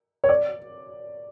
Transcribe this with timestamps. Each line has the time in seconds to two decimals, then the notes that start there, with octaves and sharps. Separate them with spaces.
0.24 C#5
0.29 D5